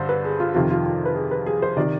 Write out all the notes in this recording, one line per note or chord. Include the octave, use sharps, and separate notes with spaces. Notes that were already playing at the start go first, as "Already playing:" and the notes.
Already playing: G2 D3 C5
B4
G#4
F4
F2 C3 D#3 F4
F4
F4
B4
G#4
B4
G#4
C5
C3 D#3 D5